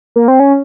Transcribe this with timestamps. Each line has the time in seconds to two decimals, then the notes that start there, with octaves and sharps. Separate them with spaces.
0.16 A#3
0.28 C4
0.40 C#4